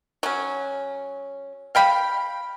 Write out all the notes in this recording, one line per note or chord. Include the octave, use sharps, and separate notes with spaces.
F#3 C#4
F5 G5 B5